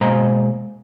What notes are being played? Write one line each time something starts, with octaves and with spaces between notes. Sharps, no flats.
B2 G#3 A#3 C5 F5 A#5